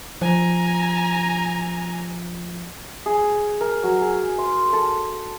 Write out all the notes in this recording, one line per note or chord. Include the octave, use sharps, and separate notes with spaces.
F3 G#5 A#5
G#4
A#4
F#3
G#4
C6
A4